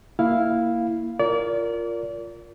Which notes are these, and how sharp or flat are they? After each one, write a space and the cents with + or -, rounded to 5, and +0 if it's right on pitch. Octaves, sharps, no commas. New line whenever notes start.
A#3 +0 E4 +0 F5 +0
F4 +0 A#4 +0 D5 -35